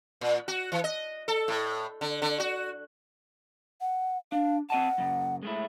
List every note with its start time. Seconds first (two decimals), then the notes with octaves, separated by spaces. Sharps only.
0.21 A#2
0.48 F#4
0.72 E3
0.84 D#5
1.28 A4
1.48 A2
2.01 D3
2.22 D3
2.40 F#4
3.80 F#5
4.32 D4 F5
4.70 C4 D#5 F#5 A5
4.98 F#2 C#3
5.43 G#3 A3 E4